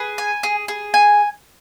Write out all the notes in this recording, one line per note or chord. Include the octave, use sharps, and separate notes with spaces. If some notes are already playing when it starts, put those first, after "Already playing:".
Already playing: G#4 B4
G#5
G#4
G#4
G#5